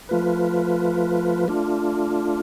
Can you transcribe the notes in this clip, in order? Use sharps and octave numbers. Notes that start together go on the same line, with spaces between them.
F3 A3 F4 B4
A3 D4 F4